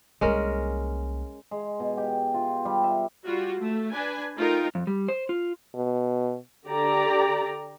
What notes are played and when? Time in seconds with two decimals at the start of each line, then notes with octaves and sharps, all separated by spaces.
0.21 C2 G#3 A#3 C#4 A#4
1.51 G#3
1.80 B2
1.97 G4
2.34 F4
2.65 G3
2.84 E5
3.26 G3 F4 F#4
3.61 A3
3.91 D4 B4 G#5
4.37 A3 D#4 F4 A#4 G5
4.75 F2
4.87 G3
5.08 C5
5.29 F4
5.75 B2
6.68 D3 G4 D5 A#5